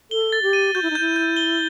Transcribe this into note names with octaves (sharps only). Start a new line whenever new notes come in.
A4 G7
A6
G4
D#7
F#4 G6
E4
D#4
E4 G6
G6
G7